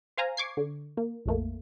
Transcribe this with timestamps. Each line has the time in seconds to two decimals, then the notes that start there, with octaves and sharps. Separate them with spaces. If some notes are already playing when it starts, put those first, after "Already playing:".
0.17 C5 F5 G#5 A#5
0.37 C#6 D6 G#6 C7
0.57 D3
0.97 A#3
1.26 A#1 F2 A3 A#3